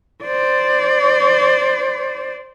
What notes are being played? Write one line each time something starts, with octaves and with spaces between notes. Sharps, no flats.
C5 D5